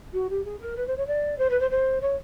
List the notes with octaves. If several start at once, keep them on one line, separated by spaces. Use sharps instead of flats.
F#4
G4
G#4
A#4
B4
C5
C#5
D5
C5
B4
C5
C5
C#5